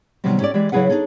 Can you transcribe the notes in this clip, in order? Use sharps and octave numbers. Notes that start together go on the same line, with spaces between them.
C3 D#3 F#3 G3 B3 C4
C#4 G4 A4 C#5 D5
E3 G#3 G4 D5
C#3 F#3 E4 G#4 B4 F#5
D4 D#4 F#4 G#4 A4 C#5